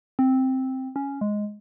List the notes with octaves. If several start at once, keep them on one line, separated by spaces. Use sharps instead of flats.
C4
C#4
G#3